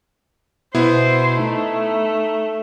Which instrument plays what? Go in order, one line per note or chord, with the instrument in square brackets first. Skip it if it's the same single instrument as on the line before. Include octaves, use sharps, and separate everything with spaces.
[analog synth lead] B2 [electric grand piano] B3 E4 [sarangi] C5
[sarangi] A3 [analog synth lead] D#4